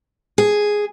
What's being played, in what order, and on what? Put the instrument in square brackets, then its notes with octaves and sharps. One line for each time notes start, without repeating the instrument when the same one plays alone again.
[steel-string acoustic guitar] G#4